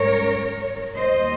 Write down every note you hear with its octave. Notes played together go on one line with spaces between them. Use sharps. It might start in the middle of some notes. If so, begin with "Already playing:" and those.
Already playing: G#2 G3 C#4 A#4 C#5
D#2 D#3 G3 C5 D#5